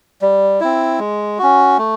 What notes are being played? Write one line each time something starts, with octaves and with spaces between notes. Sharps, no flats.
G3
C4 E4
G#3
C#4 F#4
A3